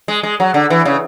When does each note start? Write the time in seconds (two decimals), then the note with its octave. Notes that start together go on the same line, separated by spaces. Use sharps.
0.08 G#3
0.23 G#3
0.40 F#3
0.54 D3
0.70 E3
0.85 C#3